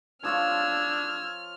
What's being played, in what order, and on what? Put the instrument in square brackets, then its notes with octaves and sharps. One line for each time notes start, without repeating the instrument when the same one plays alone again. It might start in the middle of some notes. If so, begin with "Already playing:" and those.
[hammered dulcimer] F3 F4 C#5 [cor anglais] D4 [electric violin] E6 G#6 [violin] F6